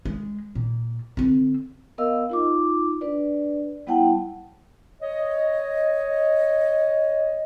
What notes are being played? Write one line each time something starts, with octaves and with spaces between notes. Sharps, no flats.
G#3
A#2
D3 C4
B3 A#4 D#5 F5 E6
D#4 F4 D6
D4 B4 D5
G3 B3 E4 F#5 G5 A5
C#5 D#5